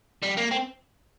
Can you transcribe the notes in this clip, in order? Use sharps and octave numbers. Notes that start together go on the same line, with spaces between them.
G3
A#3
C4